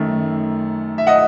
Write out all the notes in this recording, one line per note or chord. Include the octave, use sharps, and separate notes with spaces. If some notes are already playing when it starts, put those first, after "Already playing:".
Already playing: F#2 D#3 A3
E5
D#5 F#5